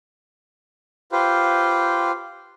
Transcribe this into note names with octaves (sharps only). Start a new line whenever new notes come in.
F4 G4 B4 C5